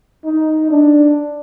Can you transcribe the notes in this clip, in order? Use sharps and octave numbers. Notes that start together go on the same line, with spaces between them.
D#4
D4